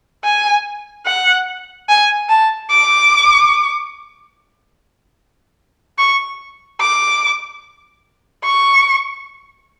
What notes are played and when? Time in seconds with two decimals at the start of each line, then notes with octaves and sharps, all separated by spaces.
0.25 G#5
1.06 F#5
1.89 G#5
2.29 A5
2.70 D6
5.98 C#6
6.81 D6
8.44 C#6